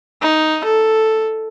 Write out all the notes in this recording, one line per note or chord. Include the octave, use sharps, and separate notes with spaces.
D#4
A4